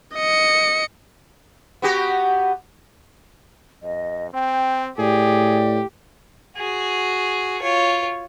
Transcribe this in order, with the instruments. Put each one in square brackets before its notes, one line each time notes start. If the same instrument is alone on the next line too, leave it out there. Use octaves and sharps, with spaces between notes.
[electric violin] D#5 C#7
[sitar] B3 F#4 G4
[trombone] F2 [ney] D#5
[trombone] C4 [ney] G5
[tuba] A2 [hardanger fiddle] G4 [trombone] G#4 [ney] D5
[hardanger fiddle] F#4 G#4
F4 C#5